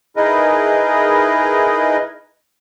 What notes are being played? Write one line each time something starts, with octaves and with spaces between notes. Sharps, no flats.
D#4 E4 G#4 A#4 B4 D#5